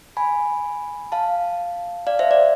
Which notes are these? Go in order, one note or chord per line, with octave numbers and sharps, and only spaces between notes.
G#5 B5
F5 A5
D5 F5
C5 E5
D5